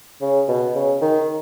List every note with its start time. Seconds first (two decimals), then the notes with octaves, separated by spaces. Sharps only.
0.22 C#3
0.48 B2
0.75 C#3
1.02 D#3